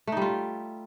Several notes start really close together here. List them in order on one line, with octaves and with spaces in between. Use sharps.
A3 D#4 G3 F4